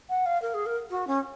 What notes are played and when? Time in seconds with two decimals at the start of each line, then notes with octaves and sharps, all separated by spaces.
0.09 F#5
0.26 F5
0.42 A#4
0.54 G#4
0.66 A#4
0.90 F#4
1.07 C#4